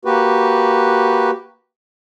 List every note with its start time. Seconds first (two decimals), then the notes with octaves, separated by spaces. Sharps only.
0.05 A#3 F#4 G4 B4